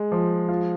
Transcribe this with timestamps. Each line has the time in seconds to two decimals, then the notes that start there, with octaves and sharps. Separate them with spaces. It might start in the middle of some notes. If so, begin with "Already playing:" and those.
Already playing: G#3
0.12 F3
0.49 F4